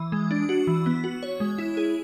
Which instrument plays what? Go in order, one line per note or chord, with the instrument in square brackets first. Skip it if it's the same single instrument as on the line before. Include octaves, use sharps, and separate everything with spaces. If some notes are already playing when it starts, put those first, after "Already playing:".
Already playing: [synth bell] E3
G#3
D4
F#4
E3
B3
F#4
C#5
G#3
E4
G#4